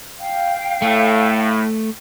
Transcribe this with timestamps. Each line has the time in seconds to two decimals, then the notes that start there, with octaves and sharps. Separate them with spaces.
0.20 F5 G5
0.82 A2 A3